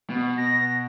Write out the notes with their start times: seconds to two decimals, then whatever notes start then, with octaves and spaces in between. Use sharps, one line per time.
0.10 B2
0.38 A#6